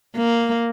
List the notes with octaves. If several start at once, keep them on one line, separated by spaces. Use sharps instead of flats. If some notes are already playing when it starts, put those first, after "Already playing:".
A#3